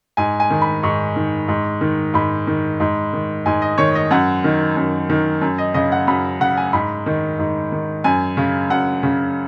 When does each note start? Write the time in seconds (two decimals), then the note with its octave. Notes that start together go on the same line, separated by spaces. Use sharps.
0.17 G#2 G#5
0.40 G#5
0.50 D#3
0.62 B5
0.83 G#2 C#6
1.16 D#3
1.48 G#2
1.81 D#3
2.14 G#2 B5
2.47 D#3
2.80 G#2
3.13 D#3
3.46 G#2 G#5
3.62 D#5
3.78 D#3 C#5
3.95 D#5
4.11 F#2 F#5
4.44 D#3
4.77 F#2
5.10 D#3
5.41 F#2
5.58 D#5
5.74 C#3 D#5
5.92 F#5
6.08 F#2 B5
6.40 C#3 F#5
6.57 G#5
6.73 G#2 B5
7.06 D#3
7.39 G#2
7.72 D#3
8.04 F#2 G#5
8.37 C#3
8.70 F#2 F#5
9.03 C#3